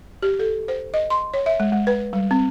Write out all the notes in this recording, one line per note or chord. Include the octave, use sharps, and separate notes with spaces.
G4
A4
C5
D#5
C6
C#5
E5
G#3
G#3
B4
G3
C4